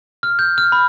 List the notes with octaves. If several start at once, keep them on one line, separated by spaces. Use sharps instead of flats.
F6
G6
F6
B5